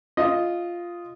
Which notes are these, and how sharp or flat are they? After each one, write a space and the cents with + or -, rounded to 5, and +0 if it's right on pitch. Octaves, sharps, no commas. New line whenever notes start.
F4 -5 D#5 +0